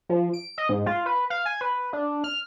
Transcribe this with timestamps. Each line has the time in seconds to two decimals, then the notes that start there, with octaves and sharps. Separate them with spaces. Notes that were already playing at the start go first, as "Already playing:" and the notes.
0.09 F3
0.33 D7
0.58 D#5
0.69 G#2
0.86 F4
1.06 B4
1.30 F5
1.45 G#5
1.61 B4
1.93 D4
2.24 F6